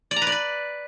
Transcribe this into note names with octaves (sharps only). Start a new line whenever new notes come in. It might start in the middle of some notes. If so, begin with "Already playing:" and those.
D5
A#5
B4
D5
B4